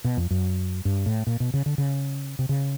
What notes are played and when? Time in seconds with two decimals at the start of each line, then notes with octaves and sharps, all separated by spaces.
0.05 B2
0.17 F2
0.31 F#2
0.85 G2
1.06 A2
1.27 A#2
1.40 B2
1.54 C#3
1.66 D3
1.78 C#3
2.39 C3
2.49 C#3